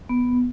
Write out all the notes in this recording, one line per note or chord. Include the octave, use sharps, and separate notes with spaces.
B3